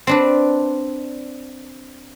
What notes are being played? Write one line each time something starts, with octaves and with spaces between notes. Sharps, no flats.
C4 D4 B4